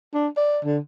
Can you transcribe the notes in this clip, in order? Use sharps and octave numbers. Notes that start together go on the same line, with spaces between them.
D4
D5
D3